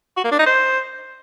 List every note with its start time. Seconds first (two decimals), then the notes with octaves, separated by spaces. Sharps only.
0.17 F#4
0.24 A#3
0.32 D4
0.39 D#4
0.46 C5